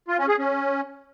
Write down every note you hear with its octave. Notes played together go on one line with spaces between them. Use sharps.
F4
C#4
G#4
C#4